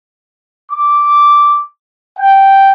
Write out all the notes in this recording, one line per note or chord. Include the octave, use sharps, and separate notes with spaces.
D6
G5